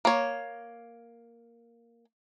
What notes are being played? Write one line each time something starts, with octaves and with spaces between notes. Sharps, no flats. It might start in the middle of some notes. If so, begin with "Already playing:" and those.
A#3 C#5